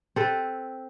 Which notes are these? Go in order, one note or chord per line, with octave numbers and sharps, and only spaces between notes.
C4 A4 B4